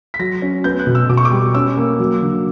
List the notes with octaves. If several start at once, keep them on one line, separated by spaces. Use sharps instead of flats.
B6
F#3 A#6
C#4
B3 G6
F#6
B2
E6
B2 D6
C#6
D6
G3
C#4 E6
A#3
F#3
D3